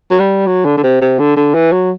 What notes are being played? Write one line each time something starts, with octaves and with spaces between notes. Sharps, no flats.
F#3
G3
F#3
D3
D3
C3
C3
D3
D3
E3
F#3